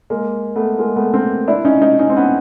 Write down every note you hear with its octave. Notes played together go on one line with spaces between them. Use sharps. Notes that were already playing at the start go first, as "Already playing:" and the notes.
G#3 A#3
A3 B3
G#3 A#3
A3 B3
A#3 C4
D4 E4
C#4 D#4
C#4 D#4
C#4 D#4
C4
B3 C#4